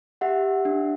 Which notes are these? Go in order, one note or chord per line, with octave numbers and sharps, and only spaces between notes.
G4 E5 F#5
D4